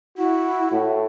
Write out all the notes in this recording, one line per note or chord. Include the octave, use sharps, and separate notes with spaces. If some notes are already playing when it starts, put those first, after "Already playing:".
E4 F#4
A2